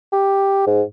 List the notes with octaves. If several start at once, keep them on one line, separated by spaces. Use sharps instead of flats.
G4
G#2